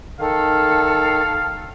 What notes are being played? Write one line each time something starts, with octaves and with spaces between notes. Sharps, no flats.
D#3 A4 F5